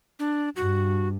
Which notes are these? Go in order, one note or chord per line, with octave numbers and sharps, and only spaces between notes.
D4
G2 F#4